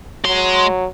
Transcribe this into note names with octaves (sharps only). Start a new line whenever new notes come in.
F#3 G#3 C6